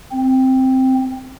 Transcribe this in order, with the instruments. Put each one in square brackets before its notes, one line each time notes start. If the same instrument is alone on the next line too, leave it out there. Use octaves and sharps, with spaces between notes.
[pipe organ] C4